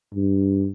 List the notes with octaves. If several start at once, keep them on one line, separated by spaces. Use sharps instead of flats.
G2